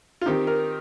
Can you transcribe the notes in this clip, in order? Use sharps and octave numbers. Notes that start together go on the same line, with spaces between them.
F4
D#3 C4 D#4 G4
A#4